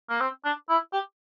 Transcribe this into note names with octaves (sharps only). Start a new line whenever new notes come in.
A#3
C4
D4
E4
G4